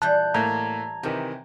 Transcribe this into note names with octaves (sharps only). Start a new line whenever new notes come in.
A#2 E3 G3 A5 F#6 G6
A2 E3 A#3 A#5 G#6
C3 D#3 E3 G4